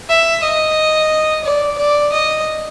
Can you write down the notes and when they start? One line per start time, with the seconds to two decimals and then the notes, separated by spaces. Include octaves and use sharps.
0.09 E5
0.43 D#5
1.44 D5
1.78 D5
2.12 D#5